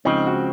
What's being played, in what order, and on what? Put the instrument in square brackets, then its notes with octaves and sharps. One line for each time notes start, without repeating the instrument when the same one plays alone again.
[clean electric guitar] C#2 C#3 F3 C4 [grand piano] D#4
[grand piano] F#4